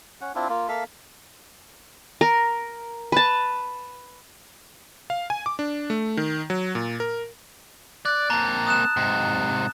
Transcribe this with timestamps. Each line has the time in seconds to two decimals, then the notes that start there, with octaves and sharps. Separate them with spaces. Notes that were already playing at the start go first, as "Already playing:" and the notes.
0.21 C#4 F#5
0.35 C4 D4 E4 F4
0.49 A#3 F4
0.68 A#3 A4 E5 F5
2.21 A#4
3.12 B4 A5
5.10 F5
5.30 G#5
5.46 D6
5.59 D4
5.90 A3
6.17 D#3
6.50 F#3
6.75 A#2
7.00 A#4
8.05 D5 F#6 A6
8.30 A#3 C4 A5 A#5
8.67 D#6 F#6 E7
8.97 G#2 C3